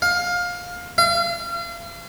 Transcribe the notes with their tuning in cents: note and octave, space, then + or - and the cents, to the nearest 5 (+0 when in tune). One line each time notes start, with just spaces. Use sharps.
F5 +20
F5 -35